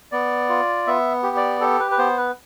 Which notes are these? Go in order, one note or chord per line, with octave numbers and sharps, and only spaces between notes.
B3 D5
F4
B3 E5
G4
D5
G4 A4
B4
B4
B3 C5
B4